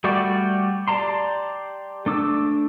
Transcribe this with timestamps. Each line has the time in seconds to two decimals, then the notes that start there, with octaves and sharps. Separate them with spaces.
0.04 G3 A3 F#4 G4 D5
0.88 G4 D5 A5 A#5 C6
2.06 A3 D4 D6 E6